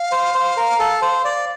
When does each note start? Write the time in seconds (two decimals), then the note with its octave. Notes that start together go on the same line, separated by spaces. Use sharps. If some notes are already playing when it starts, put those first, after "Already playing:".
Already playing: F5
0.12 C5
0.34 C5
0.57 A#4
0.80 A4
1.02 C5
1.25 D5